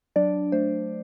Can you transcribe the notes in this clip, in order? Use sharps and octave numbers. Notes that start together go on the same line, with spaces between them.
F#3 D4 D5
A3 C5